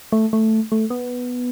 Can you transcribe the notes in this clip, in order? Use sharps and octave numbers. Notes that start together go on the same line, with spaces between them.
A3
A3
A3
B3